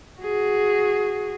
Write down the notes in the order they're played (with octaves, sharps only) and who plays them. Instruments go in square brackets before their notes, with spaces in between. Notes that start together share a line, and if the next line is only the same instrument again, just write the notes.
[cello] F#4 G#4